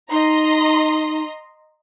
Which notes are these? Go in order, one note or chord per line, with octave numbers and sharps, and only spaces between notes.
D#4 D#5 A#5 C6